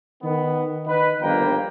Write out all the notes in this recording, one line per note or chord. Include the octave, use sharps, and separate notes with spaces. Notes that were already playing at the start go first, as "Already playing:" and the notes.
D#3 B3
D#3 D#4 B4
G1 F3 A#3 G5 A#5